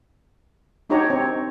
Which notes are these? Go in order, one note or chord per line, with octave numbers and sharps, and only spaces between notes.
D4 D#4 F#4 G4 C#5 A#5
C4 C#5